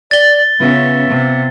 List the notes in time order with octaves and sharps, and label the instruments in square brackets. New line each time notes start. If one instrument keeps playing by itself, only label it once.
[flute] D5 [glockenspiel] A6 G7
[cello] C#3 C#4 [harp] B3 F4 [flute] E5
[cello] C3